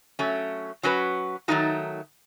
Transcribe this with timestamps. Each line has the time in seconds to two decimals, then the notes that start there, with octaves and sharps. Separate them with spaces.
0.19 F#3 A3 C#4
0.83 F#3 C#4 F#4 B4
1.48 D#3 F#3 A3 D#4 F#4